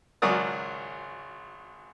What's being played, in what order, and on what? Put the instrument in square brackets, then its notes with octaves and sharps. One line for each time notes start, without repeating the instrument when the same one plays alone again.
[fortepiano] G#1 C#2 F#3 A#4 D5 D#6